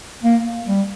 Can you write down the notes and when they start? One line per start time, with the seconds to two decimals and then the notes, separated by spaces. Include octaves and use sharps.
0.24 A#3
0.68 G3